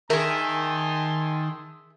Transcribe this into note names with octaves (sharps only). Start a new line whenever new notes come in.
D#3 G#4 A#4 E5 G#5 A5 C6